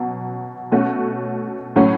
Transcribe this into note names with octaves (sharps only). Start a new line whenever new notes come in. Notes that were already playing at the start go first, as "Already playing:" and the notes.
Already playing: B2 F#3
B2 A3 C#4 F#4
A2 F#3 A3 C#4